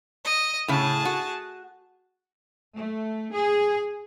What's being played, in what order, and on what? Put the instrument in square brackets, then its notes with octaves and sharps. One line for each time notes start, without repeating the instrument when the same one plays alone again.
[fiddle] D#5
[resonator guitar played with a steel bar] A2 C#3 [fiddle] G#4 A5
[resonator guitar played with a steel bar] F#4
[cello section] A3
G#4